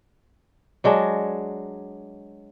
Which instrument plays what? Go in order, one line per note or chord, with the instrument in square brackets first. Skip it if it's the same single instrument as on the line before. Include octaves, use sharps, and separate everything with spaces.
[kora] F#3 G#3 D4